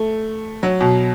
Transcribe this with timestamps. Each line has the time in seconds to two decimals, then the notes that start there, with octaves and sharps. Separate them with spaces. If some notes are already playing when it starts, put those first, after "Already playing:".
Already playing: A3
0.63 F#3
0.81 B2